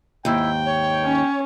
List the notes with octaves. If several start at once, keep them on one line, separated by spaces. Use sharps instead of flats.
D#2 G#2 E4 G5
C#5
C#4